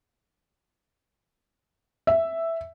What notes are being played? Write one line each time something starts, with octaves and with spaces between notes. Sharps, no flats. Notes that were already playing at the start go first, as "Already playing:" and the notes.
E5